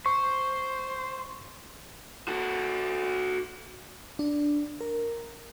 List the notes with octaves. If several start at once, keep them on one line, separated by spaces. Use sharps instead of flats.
C5 C#6
F#4 A4
D4
A#4